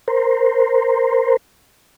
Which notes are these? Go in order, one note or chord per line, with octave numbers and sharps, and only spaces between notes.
A#4 C5